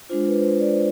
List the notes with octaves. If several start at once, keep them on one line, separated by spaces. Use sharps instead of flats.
G#3 D4 F4 C5
B4
C5
D5
C5